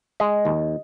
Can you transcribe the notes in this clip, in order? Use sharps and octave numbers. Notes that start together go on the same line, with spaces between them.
G#3 D#5
D#2